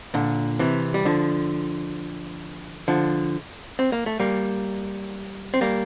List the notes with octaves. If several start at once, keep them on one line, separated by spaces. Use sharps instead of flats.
A#2 D3
C3 E3
G3
D3 F3
D3 F3
C4
A#3
A3
G3 A#3
C4
G3 A#3